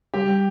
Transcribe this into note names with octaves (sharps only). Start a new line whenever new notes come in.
G3 G4
G3